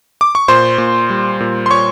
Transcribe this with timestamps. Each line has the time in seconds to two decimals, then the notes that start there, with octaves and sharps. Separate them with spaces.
0.21 D6
0.35 C#6
0.48 A#2 C5 C6
0.78 A#2
1.10 G3
1.40 A#2
1.66 C6
1.70 A#2 C#5 C#6